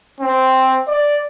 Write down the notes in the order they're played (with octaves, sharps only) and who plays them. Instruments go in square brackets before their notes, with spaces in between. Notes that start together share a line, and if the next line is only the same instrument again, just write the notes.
[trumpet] C4
D5